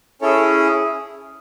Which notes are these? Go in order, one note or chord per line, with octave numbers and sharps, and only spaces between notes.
C#4 E4 G#4 A4 C#5